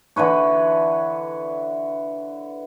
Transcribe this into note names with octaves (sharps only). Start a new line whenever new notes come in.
D3 E3 B4 C#5